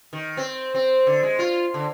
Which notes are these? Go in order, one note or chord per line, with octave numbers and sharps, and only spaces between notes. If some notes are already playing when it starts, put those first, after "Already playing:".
D#3
C4
C4
D3
G#3
F4
D3